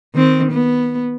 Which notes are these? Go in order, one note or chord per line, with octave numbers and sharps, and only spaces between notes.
D#3 C4
B3